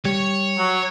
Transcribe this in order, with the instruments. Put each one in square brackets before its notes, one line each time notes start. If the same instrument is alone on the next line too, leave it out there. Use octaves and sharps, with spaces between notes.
[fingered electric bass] G3 [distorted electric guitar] C#5
[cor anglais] F#3